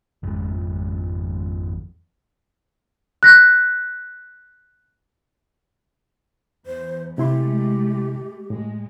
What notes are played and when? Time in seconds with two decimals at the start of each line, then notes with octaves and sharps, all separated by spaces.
0.23 G#1 F2 G#3
3.23 F#6 A#6 B6
6.66 E2 C5
7.18 C3 G#3 A3 E4 G4 C6
8.50 A2 G#3